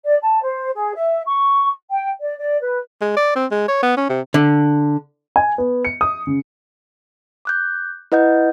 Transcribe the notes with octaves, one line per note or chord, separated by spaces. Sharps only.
D5
A5
C5
G#4
E5
C#6
G5
D5
D5
B4
G#3
D5
C4
G#3
C#5
B3
C#4
C3
D3
G#5
B3
C#7
D#6
C#3
D6 F#6 G6
E4 B4 D#5 F#5 G6